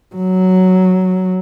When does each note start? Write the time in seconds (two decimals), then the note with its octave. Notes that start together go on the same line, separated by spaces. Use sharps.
0.15 F#3